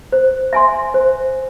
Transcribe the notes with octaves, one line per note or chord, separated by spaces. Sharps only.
C5
E5 G#5 C6
C5